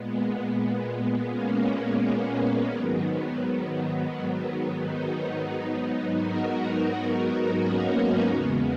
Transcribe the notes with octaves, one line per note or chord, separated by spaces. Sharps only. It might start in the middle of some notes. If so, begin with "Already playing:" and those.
Already playing: A#2 G#3 B3
A#3 C#4
B3
G#2 D#3 F#3 B3
B3
B3
B3 D#4
G#2 F#3
F#4 A#4
A#3 C#4
B3 D#4
E2 C#3 G#3 B3